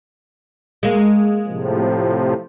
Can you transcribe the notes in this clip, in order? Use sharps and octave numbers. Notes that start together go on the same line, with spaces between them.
G#3 A#3
A2 C3 F3